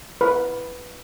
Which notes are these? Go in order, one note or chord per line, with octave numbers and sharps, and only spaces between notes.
B4